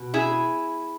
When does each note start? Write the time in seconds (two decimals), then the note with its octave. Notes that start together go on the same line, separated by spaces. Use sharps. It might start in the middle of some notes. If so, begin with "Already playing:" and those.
Already playing: B2
0.14 E4 G#4